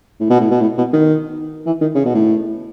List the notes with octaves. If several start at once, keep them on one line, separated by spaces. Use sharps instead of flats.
A2
B2
A2
B2
A2
B2
D#3
E3
D#3
C#3
B2
A2